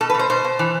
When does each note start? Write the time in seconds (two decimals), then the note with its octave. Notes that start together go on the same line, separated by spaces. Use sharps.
0.01 B2 A4
0.10 B4
0.14 B2
0.19 C5
0.30 B2 C5
0.44 B2
0.59 E3